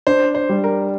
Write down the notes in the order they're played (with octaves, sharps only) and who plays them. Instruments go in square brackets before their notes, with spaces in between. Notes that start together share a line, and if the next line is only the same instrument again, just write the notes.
[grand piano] D4 [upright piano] C5
[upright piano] C5
[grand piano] G3
[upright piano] A#4